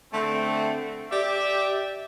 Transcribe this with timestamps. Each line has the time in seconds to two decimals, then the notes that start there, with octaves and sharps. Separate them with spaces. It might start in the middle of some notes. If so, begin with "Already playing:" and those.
0.13 D3 A3 C4
1.12 G4 D5 E5